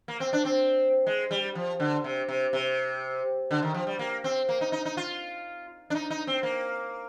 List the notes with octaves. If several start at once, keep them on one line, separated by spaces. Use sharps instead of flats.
A#3
C4
D4
C4
G#3
G3
F3
D3
C3
C3
C3
D3
D#3
F3
G3
A#3
C4
A#3
D#4
D#4
D#4
F4
D4
D#4
D#4
C4
A#3